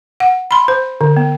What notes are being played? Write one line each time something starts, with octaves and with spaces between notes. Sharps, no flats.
F#5
B5 C6
C5
D3
B3